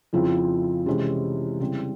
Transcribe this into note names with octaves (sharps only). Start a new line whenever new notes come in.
F2 C#3 F3 C4 E4
C3 E3 G#3 C#4 E4
C#3 G3 C4 E4